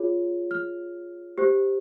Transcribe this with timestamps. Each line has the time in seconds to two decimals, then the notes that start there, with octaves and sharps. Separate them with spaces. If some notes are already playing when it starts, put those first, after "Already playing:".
Already playing: F4 G#4 C#5
0.51 F6
1.38 G4 C5